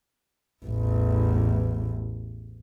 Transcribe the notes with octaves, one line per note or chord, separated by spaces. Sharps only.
A1 E2